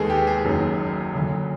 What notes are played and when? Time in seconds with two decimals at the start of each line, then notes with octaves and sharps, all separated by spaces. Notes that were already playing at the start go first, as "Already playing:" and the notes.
Already playing: D#2 D#3 G#3 B3 G#4 A4
0.10 G4
0.27 G#4
0.44 F#1 F#2 D#3 F#3
1.15 D2 D3 F#3